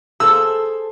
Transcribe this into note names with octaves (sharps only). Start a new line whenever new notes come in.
G#4 A4 C5 E6